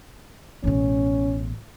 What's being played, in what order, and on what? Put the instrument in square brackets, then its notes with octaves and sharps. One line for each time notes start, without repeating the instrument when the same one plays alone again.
[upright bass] A1 B2 [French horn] C#4